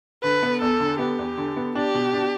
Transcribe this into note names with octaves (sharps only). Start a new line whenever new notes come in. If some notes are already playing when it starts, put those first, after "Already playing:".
D3 B4
B3
E2 A4
D3
B3 G4
E2
D3
B3
D4 G4
B2
D4